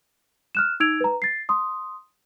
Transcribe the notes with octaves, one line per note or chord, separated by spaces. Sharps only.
F6 F#6 E7
D#4 E6 G#6 D7 F7
B4 A#5
A6 C7
C6 D#6